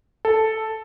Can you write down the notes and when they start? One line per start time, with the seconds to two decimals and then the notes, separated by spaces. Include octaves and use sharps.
0.25 A4